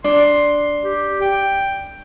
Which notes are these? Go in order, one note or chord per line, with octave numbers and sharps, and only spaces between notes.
D4 C6
G4
G5